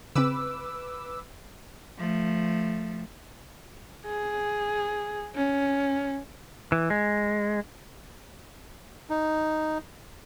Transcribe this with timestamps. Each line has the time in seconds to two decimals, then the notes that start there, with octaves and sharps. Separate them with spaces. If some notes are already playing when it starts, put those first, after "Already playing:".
0.15 C#3 C4 B4 D6 E6
1.98 F3 A3
4.05 G#4
5.35 C#4
6.72 E3
6.90 G#3
9.10 D#4